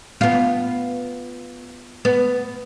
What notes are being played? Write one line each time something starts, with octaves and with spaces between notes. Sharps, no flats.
B3 F4
B3